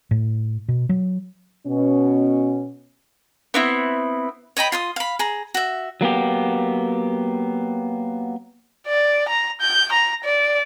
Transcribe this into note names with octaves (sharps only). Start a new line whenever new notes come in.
A2
B2
F#3
B2 C#4
B3 C4 E4
C#5 D#5 G5 B5
F4 C6 D#6
F5 B5
G#4 A#5
F#4 E5
F#3 A#3 B3 G4
D5
A#5
G6
A#5
D5